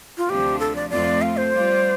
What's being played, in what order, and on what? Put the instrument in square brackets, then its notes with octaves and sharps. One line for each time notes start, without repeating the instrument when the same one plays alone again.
[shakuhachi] F4
[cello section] D2 C3 F3 D4 [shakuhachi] G4
[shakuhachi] A4
D5
[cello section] F2 F3 A3 C4 F4 [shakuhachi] D5
[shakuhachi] F5
C5
[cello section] G3 F4 D5